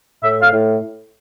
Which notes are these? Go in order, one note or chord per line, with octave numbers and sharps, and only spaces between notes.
A2 E5
F5
A2